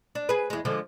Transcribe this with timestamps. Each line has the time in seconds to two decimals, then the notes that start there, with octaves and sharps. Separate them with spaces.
0.15 D4
0.29 G#4 B4
0.50 E2 G#3
0.65 D3 F3 G#3